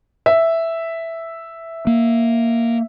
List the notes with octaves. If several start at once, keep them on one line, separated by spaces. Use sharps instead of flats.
E5
A#3